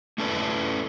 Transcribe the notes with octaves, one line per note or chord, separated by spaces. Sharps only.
A3 C#4 E4 A4 B4 D5